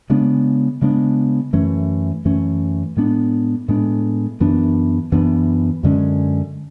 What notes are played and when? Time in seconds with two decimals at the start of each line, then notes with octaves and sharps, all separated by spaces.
0.10 C#3 G#3 B3 D4
0.82 C#3 G#3 B3 D4
1.53 F#2 E3 A3 C#4
2.25 F#2 E3 A3 C#4
2.97 A2 G#3 B3 D4
3.68 A2 G#3 B3 D4
4.40 F#2 E3 B3 D4
5.12 F#2 E3 B3 D4
5.83 F#2 D3 G#3 C#4